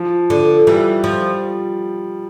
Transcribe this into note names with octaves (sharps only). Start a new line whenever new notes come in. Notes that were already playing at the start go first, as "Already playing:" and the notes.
Already playing: F3
D3
E3 G3
F3